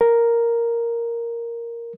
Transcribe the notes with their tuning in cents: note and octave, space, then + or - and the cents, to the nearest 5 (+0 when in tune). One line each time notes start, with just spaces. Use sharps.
A#4 +0